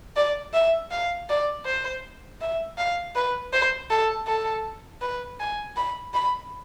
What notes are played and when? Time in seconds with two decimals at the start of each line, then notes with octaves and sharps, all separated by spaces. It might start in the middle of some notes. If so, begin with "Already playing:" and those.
0.16 D5
0.53 E5
0.91 F5
1.29 D5
1.65 C5
2.41 E5
2.78 F5
3.15 B4
3.53 C5
3.90 A4
4.27 A4
5.01 B4
5.40 G#5
5.76 B5
6.14 B5